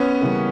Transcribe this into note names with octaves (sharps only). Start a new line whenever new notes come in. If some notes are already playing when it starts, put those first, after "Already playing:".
Already playing: B3 C#4
C#3 E3 G3 A#3